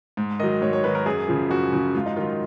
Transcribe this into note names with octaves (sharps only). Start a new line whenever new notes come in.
G#2
D#3 F#3 D#5
G#2 C#5
C#5
D#3 F#3 B4
A#4
F#2 G#4
C#3 F3
F#2 F#4
C#3 F3
G#2 F4
D#4
D#3 F#3 F4